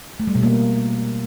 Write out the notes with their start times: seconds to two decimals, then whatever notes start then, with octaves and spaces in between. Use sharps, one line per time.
0.20 A3
0.27 G3
0.35 B2
0.43 A#3